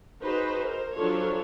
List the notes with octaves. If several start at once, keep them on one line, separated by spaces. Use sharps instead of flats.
D#4 F#4 G#4 B4 C5
A#4 C5
F3 F#3 D4 F4 A4 C#5